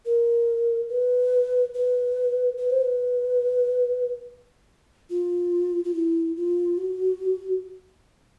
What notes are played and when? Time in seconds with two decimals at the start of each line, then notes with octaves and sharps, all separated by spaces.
0.05 A#4
0.89 B4
1.74 B4
2.57 B4
2.70 C5
2.82 B4
5.10 F4
5.84 F4
5.94 E4
6.37 F4
6.78 F#4